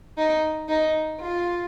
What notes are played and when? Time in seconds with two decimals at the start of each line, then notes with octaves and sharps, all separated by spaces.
0.17 D#4
0.68 D#4
1.20 F4